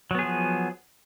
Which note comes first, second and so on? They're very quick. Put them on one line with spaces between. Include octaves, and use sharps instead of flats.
F#3 B3 G#4 F3